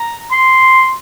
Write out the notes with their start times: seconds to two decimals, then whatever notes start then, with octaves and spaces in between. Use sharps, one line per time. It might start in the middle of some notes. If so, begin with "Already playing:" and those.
Already playing: A#5
0.31 C6